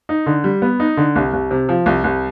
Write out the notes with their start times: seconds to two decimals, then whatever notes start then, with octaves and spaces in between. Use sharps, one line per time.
0.09 D#4
0.26 D3
0.44 G3
0.62 B3
0.80 D#4
0.97 D3
1.16 C2
1.33 C2
1.51 C3
1.69 F3
1.86 C2
2.04 C2